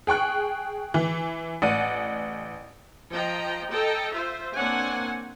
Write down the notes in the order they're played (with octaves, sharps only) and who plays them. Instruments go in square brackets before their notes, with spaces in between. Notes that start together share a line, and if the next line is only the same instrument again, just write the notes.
[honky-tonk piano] G#4 G5 C#6 F#6
E3
A1 D5 F#5 D#7
[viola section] F3 D#5 G5 A#5
A4 D#5 G5 A#5
F4 C5 E5
A#3 C4 D4 C#5 F#5 G#5